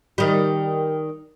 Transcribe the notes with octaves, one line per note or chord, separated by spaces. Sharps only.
D#3 G3